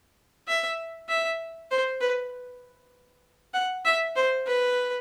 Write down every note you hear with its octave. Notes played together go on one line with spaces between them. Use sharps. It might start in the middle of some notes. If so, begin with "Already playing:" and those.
E5
E5
C5
B4
F#5
E5
C5
B4